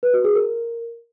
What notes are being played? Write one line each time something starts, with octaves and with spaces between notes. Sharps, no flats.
B4
F#4
G#4
A#4